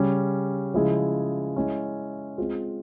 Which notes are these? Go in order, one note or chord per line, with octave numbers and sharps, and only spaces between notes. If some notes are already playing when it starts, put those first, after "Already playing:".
Already playing: C#3 G3 C#4
C#3 F3 G#3 E4 G#4
G#3 C#4 E4
G#3 C4 F4 G#4